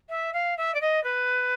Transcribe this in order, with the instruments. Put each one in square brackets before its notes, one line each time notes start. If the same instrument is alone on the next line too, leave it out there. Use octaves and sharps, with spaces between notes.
[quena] E5
F5
E5
D5
D#5
B4